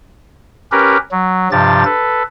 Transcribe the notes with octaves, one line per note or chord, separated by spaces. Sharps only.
C#4 G4 A#4 B4
F#3
G2 C3 F3 G4 A6
A4 B4